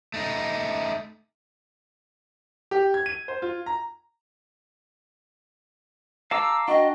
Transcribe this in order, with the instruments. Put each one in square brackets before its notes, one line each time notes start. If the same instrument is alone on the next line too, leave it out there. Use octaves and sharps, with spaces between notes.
[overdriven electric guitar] A3 D#4
[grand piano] G4
G#6
D#7
C5
F4
A#5
[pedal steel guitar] F5 A5 D6 [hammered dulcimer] A#5 [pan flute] E6
[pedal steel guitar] D4 [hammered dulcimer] F#4 G5 [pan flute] D#5